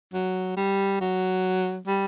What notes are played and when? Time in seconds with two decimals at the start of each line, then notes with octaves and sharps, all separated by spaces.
0.13 F#3
0.57 G3
1.01 F#3
1.87 G3